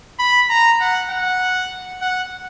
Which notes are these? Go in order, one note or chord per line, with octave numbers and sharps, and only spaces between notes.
B5
A#5
F#5
F#5
F#5